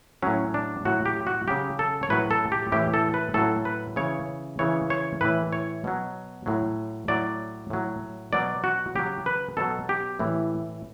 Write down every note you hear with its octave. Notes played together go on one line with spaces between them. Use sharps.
A2 F#3 C#4
D4
A2 F#3 F#4
G4
F#4
C#3 F#3 G4
A4
C#5
A2 F#3 B4
A4
G4
A2 E3 G4
A4
B4
A2 F#3 A4
B4
C#3 E3 C#5
C#3 E3 C#5
C#5
A2 E3 B4
C#5
B2 F#3
A2 F#3
A2 F#3 D5
A2 F#3
B2 F#3 D5
F#4
C#3 F#3 G4
B4
B2 F#3 A4
G4
A2 E3